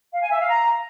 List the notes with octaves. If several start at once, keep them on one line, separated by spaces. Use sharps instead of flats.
F5
G#5
E5
F5
A#5